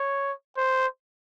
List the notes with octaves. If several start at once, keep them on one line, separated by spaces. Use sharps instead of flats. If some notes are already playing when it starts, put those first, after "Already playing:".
Already playing: C#5
C5